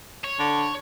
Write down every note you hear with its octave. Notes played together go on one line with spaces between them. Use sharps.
C#5
D3